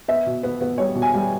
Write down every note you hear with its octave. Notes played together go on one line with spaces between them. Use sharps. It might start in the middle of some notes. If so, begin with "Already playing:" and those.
B3 E5
B2
B3
B3
G3 C#5
B2
G#5
G3